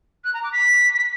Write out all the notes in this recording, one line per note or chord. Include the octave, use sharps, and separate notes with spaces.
F#6
A#5
D6
B6